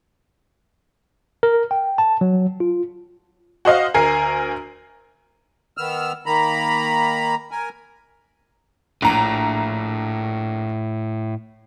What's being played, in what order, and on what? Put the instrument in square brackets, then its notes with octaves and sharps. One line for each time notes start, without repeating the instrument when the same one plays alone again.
[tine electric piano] A#4
G5
A5
F#3
F4
[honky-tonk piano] F#4 C5 D#5 F5
D2 A#4 G#5 C7
[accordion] D#3 B3 E6 F6
D#3 A#3 A#5 B5
A#4 G#5
[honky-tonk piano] A#1 A#5 [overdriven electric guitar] A2